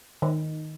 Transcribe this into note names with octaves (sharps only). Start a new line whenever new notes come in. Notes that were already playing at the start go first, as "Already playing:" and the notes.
D#3